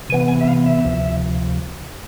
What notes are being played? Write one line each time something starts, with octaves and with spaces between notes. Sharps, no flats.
C3 E3 B3 G#5
G#5
E5
F5
E5
D2 C3 F3